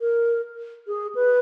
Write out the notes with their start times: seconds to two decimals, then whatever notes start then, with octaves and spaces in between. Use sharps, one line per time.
0.01 A#4
0.87 G#4
1.15 B4